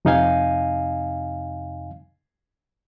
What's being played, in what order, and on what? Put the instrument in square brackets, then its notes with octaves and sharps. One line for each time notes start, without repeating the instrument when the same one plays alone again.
[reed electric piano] F2 C3 D#4 D#5 F5 G#5